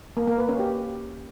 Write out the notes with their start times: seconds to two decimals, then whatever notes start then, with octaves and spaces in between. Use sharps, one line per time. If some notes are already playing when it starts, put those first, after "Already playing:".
0.17 A#3
0.27 A#3
0.38 B4
0.49 C#4
0.59 G4